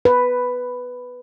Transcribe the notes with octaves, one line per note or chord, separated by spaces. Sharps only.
B4